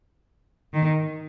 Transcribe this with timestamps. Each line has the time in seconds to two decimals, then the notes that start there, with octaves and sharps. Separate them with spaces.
0.74 D#3